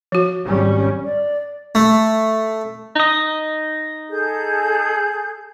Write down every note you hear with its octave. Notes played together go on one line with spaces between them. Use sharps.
F3 F#4
G#1 G3 C#4
D5
A3
D#4 D#5
G#4 A4 G6